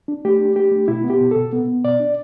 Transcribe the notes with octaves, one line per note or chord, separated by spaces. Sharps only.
D4
A3 G4
D4
A3 G4
A3
B2 E4
B3
G4
B2
B2 A4
B3
B3
B2 D5
D4